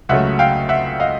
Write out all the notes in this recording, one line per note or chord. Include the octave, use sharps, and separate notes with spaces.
C#2 C#3 F#3 A3 E5 F#5
F5 G5
E5 F#5
D#5 F5